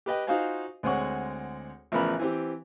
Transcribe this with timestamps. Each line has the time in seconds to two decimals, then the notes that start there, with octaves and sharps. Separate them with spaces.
0.06 G4 B4 D#5 G5
0.27 D#4 F4 F#4 C5 F5 G#5
0.83 D2 G#3 C4 C#5 F#5 C#6
1.92 A1 C#3 F3 B3 A#4 B5
2.19 E3 C4 G4